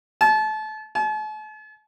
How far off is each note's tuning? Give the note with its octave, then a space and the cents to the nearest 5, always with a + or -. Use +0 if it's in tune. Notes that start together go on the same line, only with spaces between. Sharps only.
A5 -30
A5 -45